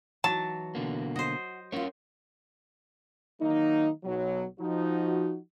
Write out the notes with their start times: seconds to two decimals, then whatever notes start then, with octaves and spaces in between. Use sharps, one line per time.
0.24 E3 F#3 D#4 F#4 A5
0.75 B2 D3 A#3
1.16 F#4 C5 D#5
1.72 A#3 C#4 F4 A#4 C#5
3.41 D#3 F#3 A#3 D#4
4.04 B1 F#3
4.59 F3 D#4 F#4